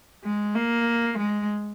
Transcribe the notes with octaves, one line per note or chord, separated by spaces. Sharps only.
G#3
A#3
G#3